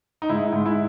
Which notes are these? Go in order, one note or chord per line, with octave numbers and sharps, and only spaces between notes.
D#4
G#2 E4
G#2
E4